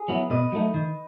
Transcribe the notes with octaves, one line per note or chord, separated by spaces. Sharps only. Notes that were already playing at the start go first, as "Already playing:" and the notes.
Already playing: G#4
F#3 B3 E4
B2 B4 D#5
F#3 A3 D#4
D#3